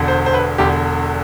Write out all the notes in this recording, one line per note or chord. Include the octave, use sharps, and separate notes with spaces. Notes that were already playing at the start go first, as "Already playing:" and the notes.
Already playing: E1 E2 D3
C5
C5
B4
E1 E2 D3 G4